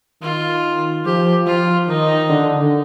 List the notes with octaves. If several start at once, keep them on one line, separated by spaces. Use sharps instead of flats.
D#3 F4
F3 G4
F3 F4
D#3 D#4
D3